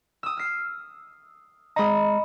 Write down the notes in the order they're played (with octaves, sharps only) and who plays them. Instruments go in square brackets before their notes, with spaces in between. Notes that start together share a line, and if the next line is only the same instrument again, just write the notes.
[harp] D#6 E6
F6 C7
[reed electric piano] G#3 A#5 [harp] D#5 B5 D#6